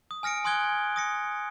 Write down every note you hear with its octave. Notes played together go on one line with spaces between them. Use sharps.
D#6
G#5 F6 A#6 C#7 D7
G#5 C6 D#6 F#6 G#6 G7
D#6 A#6 C#7